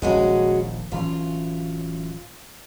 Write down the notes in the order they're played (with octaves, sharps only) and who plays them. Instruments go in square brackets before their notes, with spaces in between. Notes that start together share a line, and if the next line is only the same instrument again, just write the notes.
[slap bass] D#1 A#1 [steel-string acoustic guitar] G#3 C#4 F#4
[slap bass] D1 E3 C#4 [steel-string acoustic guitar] F4